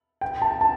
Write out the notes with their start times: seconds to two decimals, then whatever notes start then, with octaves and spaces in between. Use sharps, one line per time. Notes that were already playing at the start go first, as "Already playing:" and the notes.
0.21 G5
0.42 A5
0.61 A5